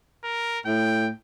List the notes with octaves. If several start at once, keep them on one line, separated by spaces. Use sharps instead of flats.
A#4
A2 G5